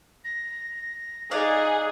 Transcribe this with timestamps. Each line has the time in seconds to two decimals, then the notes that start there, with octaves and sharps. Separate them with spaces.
0.24 A#6
1.31 D#4 G#4 D5 F5 F#6